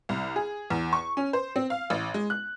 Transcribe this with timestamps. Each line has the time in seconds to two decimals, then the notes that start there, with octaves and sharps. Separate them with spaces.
0.09 C2
0.36 G#4
0.70 E2
0.93 C#6
1.17 C#4
1.33 C5
1.56 C4
1.70 F5
1.90 A1
2.14 G#3
2.30 F#6